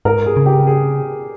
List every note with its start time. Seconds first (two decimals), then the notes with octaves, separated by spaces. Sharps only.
0.05 G#2 A#4
0.26 G#4
0.37 C#3
0.46 G4
0.67 G#4